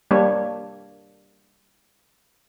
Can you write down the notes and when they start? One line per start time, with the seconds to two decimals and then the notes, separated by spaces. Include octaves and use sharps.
0.11 G3 A#3 D4 C#5